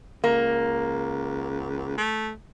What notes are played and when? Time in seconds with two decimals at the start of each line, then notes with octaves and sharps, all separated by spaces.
0.24 C#2 A#3
1.98 A3